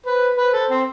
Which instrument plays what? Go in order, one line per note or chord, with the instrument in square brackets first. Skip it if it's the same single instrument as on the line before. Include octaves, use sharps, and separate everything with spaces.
[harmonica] B4 [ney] C5
[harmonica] B4 [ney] C5
[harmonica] A4
C4